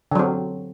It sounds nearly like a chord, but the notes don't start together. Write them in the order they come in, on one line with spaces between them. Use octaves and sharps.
D3 F#3 C4